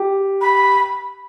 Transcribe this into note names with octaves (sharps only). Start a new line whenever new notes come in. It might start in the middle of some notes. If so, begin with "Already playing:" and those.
Already playing: G4
B5